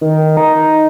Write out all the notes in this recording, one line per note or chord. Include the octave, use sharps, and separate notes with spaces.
D#3
D#4